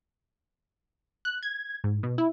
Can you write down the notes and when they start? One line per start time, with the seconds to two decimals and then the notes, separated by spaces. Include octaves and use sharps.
1.25 F#6
1.43 G#6
1.84 G#2
2.03 B2
2.18 E4